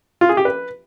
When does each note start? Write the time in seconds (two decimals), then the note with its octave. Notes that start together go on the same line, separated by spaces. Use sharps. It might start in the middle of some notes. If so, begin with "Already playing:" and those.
0.21 F4
0.29 G#4
0.37 G4
0.45 B4